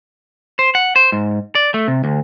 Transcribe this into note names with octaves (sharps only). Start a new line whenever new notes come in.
C5
F#5
C5
G#2
D5
A3
C3
D2